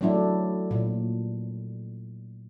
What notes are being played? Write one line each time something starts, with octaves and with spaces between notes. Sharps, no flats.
F#3 A3 D4 E4
A#2